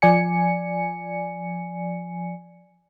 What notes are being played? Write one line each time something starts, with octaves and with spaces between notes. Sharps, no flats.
F3 D5 G#5 C#7